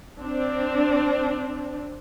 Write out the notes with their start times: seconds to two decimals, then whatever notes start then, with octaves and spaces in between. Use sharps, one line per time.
0.22 C4 D4